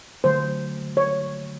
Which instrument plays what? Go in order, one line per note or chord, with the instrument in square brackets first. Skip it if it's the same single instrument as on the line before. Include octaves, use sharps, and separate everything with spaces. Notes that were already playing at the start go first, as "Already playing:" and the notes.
[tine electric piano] D3 F#3 A3 [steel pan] C5
[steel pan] C#5